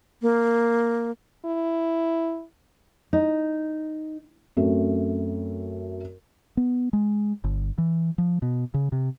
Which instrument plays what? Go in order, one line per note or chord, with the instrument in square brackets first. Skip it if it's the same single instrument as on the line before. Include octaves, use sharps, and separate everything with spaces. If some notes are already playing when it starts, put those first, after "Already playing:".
[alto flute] A#3
[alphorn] E4
[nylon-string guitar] D#4
[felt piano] F#2 A3 C4
[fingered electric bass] B3
G#3
G1
E3
F3
B2
C#3
C3